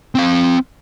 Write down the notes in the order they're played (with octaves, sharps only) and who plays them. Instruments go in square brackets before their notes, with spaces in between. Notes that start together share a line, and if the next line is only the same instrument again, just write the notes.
[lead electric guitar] C4 F5